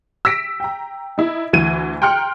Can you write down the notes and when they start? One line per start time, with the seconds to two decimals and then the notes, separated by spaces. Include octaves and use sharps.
0.25 E6 A#6 B6 D7
0.60 G5 A#5
1.18 D#4 E4
1.53 D2 E3 G#6 D#7
2.02 G5 A#5 C6 F6 F#6 C#7